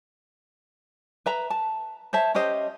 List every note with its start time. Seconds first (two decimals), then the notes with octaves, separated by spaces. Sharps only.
1.26 B4 E5 A#5
1.50 A5
2.13 C5 C#5 E5 A5
2.35 C#4 G4 C5 D#5